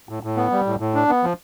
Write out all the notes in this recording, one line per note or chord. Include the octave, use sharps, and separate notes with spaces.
A2
A2
B3
G3
A2
A2
D4
B3
F3